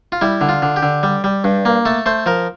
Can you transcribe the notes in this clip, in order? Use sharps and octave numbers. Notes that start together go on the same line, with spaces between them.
F4
G3 E4
D3
F4
D3
G4
D3
G3
G3
G2
A#3
A3 A4
A3 C5
F3 A#4